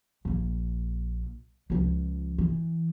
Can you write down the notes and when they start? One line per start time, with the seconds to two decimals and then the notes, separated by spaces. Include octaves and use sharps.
0.25 A#1 A#3
1.70 C#2 F3
2.38 E3